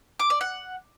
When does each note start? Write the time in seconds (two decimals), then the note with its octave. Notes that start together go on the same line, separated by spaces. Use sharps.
0.20 D6
0.30 D5
0.41 F#5